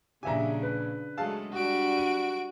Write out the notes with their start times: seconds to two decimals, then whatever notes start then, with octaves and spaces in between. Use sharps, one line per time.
0.23 A#1 C#3 D4 G4 E5 G#5 A#5
0.63 B4
1.18 F#3 G#3 A3 G#4 F5 A5
1.53 G3 D4 F#4 F#5 D7
1.97 D#7